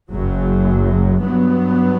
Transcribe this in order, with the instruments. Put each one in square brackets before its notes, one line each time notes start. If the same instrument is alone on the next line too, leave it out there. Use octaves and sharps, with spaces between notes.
[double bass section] F#1 F#2 F#3
G2 F#3 B3